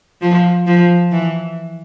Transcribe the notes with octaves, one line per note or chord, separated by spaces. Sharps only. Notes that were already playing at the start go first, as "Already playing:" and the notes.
F3
F3
E3